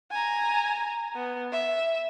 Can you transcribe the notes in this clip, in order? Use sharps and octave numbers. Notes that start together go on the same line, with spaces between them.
G#5 A#5
B3
E5